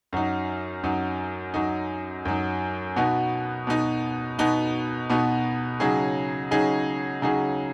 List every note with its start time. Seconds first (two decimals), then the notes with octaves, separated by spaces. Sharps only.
0.13 F#2 F#3 D#4
0.83 F#2 F#3 D#4
1.54 F#2 F#3 D#4
2.25 F#2 F#3 D#4
2.96 B2 B3 D#4 F#4
3.67 B2 B3 D#4 F#4
4.39 B2 B3 D#4 F#4
5.10 B2 B3 D#4 F#4
5.80 C#3 F#3 D#4 G#4
6.51 C#3 F#3 D#4 G#4
7.22 C#3 F#3 D#4 G#4